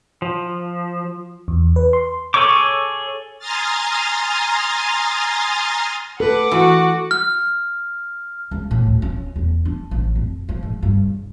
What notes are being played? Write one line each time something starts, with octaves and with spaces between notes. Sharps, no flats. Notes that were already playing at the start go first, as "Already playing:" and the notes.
F3
E2
B4
C6
G#4 A4 C#5 C#6 D6
G#5 A#5 C6 D#6 F6 A6
A4 B4 F#5 D6
E3 F#4
F6
C#2
A2
D2
C#4
E2
D4
A1
F2
F3
G#2
G2
C#3